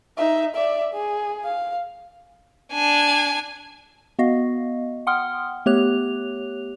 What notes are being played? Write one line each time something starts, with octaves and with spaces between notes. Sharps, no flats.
D#4 E5
D5 E5
G#4
F5
D4 G#5
B3 F#4 D#5 F5
F#5 G5 C6 D#6 F6
A3 B3 G4 C#5 F#6 F7